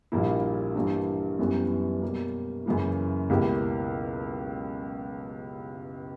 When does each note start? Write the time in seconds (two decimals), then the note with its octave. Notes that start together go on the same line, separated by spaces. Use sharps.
0.12 A#1 A#2 G3 A#3 E4
0.75 G2 E3 G3 A#3
1.39 F#2 E3 G3 B3
2.02 B2 G3 A#3
2.66 F#2 C#3 E3 A#3 E4
3.30 C#2 B2 A#3 E4 G4